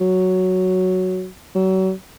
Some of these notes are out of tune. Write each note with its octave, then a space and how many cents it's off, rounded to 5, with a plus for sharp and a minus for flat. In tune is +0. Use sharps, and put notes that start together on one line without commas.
F#3 +0
F#3 +35